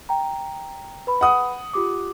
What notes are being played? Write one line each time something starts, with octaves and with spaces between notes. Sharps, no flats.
G5 A#5
B4 B5
F#5 D#6
F4 G4 D6